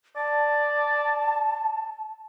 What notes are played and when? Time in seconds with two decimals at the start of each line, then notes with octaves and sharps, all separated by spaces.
0.16 D5 A5